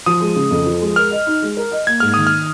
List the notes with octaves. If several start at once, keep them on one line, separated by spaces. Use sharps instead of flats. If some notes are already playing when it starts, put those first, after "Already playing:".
F3 D#6
G#3
C#3
F2
F3
G#3
A#4 F6
D#5
D#4
G#3
A#4
D#5
A#3 G#6
G#2 F6
D#3 D#6
F6